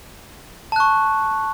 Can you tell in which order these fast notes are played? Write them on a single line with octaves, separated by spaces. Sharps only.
A5 F#6 C#6